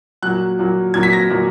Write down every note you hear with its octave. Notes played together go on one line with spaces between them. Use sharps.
A#2 F#3 F#6
A#2 F#3
A#2 F#3 G#6
B6
A#6
A#2 F#3